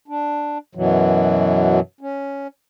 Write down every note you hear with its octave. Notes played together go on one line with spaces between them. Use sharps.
D4
F#2 B2 E3 F#3
C#4